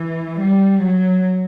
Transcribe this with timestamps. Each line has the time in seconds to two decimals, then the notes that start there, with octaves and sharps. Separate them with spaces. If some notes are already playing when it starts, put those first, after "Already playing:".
Already playing: E3
0.42 G3
0.83 F#3